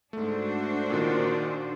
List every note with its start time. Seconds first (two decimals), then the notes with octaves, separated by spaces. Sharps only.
0.13 G#2 A3 D4 F#4 C5
0.90 A#2 D#3